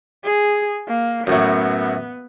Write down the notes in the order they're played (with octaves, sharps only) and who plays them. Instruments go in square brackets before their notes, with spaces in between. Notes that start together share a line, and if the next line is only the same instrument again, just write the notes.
[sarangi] G#4
A#3
[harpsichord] F#2 A2 F#3 [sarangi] B3